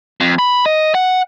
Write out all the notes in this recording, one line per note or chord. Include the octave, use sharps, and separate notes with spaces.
F2
B5
D#5
F#5